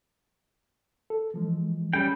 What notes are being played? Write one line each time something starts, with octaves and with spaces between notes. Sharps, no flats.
A4
E3 F3 G#3
G3 C#4 G#4 G5